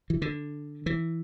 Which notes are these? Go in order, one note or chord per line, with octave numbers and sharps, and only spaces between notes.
E3
D3
E3